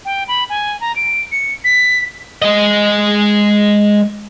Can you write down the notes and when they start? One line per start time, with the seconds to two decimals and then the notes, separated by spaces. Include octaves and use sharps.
0.05 G5
0.28 B5
0.49 G#5
0.81 A#5
0.96 D7
1.32 C#7
1.64 B6
2.42 G#3 D#5